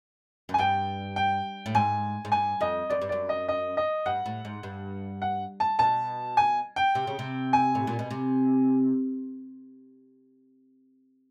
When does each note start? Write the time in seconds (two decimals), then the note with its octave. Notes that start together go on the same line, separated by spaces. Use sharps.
0.49 F#2
0.54 G#5
0.59 G2 G5
1.16 G5
1.66 A2
1.75 G#2 G#5
2.25 G#2
2.32 G2 G#5
2.61 F2 D#5
2.90 F#2 D5
3.01 G2
3.09 F#2 D5
3.29 D#5
3.48 D#5
3.77 D#5
4.06 G2 F#5
4.26 A2
4.45 G#2
4.63 G2
5.22 F#5
5.60 A5
5.79 B2 A5
6.37 G#5
6.76 G5
6.95 C3
7.07 C#3
7.19 C3
7.53 G#5
7.75 A2
7.87 A#2
7.99 B2
8.11 C3